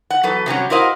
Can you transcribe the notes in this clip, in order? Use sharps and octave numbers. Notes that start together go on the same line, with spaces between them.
F#5
E2 F#3 A4 B4
C3 F#3 G3 C#4
E4 F#4 A#4 C5 D#5 F5